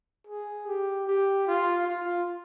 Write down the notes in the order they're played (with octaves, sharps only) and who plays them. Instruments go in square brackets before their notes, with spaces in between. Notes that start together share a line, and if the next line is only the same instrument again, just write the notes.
[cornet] G#4
G4
G4
F4
F4